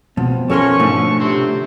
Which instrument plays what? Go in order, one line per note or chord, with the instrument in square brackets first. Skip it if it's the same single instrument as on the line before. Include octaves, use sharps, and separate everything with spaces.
[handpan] B2 C4 [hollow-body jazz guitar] F3 [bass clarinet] B3
[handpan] F3 F4 C#5 [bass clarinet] C#4 [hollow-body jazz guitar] A4 A#4 C6 [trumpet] C#6
[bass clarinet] G#2 [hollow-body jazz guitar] B2 D3 A3
[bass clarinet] C3 [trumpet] C4